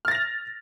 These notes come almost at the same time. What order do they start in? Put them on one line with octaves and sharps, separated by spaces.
F6 A6 A#6 F7